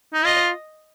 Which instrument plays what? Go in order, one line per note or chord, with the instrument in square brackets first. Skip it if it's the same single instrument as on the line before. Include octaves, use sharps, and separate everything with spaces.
[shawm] D#4
[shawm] F4 [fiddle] D#5